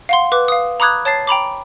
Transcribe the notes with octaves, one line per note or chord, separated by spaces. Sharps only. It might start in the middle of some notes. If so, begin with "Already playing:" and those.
F5 F#5 C6
B4 D6
F5 D#6
A#5 B5 D6 D#6 F#6 G#6
C#5 A5 A6 C7
G5 A#5 B5 D6